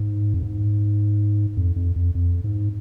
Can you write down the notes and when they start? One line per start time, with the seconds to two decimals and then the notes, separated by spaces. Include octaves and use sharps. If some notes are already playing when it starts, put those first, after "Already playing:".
Already playing: G#2
0.34 F2
0.43 G#2
1.57 F2
1.76 F2
1.96 F2
2.15 F2
2.44 G#2